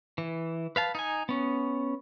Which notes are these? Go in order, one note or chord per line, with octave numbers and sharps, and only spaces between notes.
E3
B4 F5 A5
D#4 G#5
B3 C#4